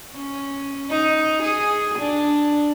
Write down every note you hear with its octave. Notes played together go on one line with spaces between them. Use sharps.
C#4
D#4
G#4
D4